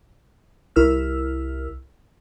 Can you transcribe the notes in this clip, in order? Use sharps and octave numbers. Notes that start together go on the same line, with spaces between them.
C2 E4 A#4 E6 F6